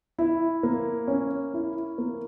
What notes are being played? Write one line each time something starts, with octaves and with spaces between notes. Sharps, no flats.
E4
A#3
C#4
E4
A#3